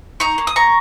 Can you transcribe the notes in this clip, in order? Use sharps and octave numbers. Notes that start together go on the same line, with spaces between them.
D#4 A#5 C#6
A#3
D#6
A#3 A#5 C#6